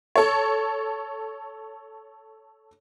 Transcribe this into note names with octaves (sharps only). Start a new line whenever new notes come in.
A4 C#5